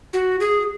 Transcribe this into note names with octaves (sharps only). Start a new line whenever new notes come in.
F#4
G#4